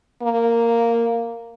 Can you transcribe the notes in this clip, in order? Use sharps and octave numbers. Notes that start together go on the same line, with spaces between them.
A#3